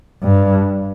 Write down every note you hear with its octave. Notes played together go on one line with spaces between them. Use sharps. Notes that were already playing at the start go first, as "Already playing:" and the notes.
G2